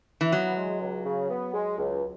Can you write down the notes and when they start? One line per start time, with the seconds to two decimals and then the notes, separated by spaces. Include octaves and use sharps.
0.21 E3
0.32 F#3 B3
0.56 G#3
0.81 C#2
1.05 C#3
1.30 B3
1.54 G#3
1.78 C#2